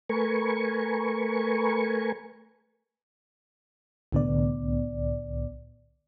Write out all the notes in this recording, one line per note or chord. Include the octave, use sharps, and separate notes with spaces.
A3 A#4 B4 G#5 C#6
C2 A2 D3 B3 D5